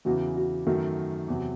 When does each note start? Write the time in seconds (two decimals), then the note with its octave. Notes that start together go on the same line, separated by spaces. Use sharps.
0.05 E2 C#3 E3 F#4
0.35 F#4
0.67 F#2 D#3 A3 F#4
1.28 E2 C3 F#3